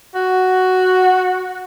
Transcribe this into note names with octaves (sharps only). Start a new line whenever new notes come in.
F#4